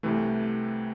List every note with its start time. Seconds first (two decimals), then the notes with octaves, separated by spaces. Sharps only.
0.03 C2 C3 E3 A3